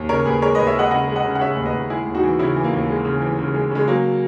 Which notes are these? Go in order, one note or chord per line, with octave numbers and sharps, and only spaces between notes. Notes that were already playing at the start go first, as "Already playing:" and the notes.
Already playing: D#2
C#3 A#4 C#5
D#2 G#4 B4
G#3 A#4 C#5
D#2 B4 D#5
C#5 E5
G#3 D#5 F#5
C#3 D#5 F#5
G#3
D#5 F#5
C#3
F#5
C#3 C#5 E5
D#2
B4 D#5
D#2
G#3 E4 G#4
D#2
D#4 F#4
E3
C#3 C#4 E4
E3
A#3
D#2
G#3
C#3
E3
C#3
G#3
C#3 G#3
F#3 A#3